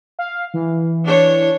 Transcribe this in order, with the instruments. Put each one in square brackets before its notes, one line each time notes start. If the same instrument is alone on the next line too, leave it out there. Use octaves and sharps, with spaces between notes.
[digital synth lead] F5
E3
[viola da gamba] D4 C#5